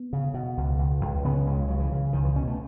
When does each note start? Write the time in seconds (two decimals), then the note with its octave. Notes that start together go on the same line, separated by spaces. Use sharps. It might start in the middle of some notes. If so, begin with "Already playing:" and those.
Already playing: B3
0.13 C#3
0.34 B2
0.57 C#2
0.79 C#2
1.01 C#2
1.24 C#3 B3
1.46 C#2 G#3
1.68 C#3 F#3
1.80 E3
1.92 C#3
2.13 C#2 D#3
2.25 E3
2.35 B2 C#4
2.47 A3